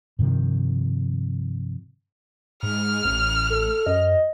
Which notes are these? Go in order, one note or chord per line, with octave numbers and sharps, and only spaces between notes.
G2 C3 D#3 F3
G#2 F6
A1
A4
F#2 D#5